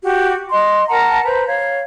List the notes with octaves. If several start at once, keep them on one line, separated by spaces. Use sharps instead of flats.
F#4 G4
D#5 C6
A#4 F#5 A5 A#5
B4 C5 A#5
C#5 F5